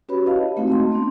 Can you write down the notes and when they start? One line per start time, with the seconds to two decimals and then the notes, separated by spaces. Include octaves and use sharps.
0.09 C#4 F#4 G4 B4 C#5 B5
0.26 E4 D#5 F5 A5
0.56 G#3 A3 C4 D#4 E4 F#4
0.68 D#5 A5 C6
0.91 A3 B3 C#4 D4